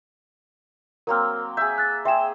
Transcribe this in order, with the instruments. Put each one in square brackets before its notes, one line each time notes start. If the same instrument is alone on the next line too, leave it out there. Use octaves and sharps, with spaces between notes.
[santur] F#3 A#3 C4 [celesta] A#4 F6
[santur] G#4 E5 [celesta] G6
[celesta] F#6 A6
[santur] G#4 C5 [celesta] E5 G5 E7